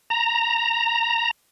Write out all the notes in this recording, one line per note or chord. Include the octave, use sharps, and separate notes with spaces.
A#5